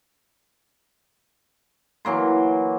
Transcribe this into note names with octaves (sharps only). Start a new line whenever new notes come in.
E3 F#3 A#3 C6